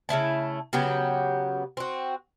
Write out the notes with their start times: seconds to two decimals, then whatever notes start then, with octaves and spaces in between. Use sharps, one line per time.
0.09 C#3 A3 E4 A5
0.73 C#3 F#3 B3 G4
1.77 C4 F#4